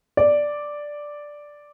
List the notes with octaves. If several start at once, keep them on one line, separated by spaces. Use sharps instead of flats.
D5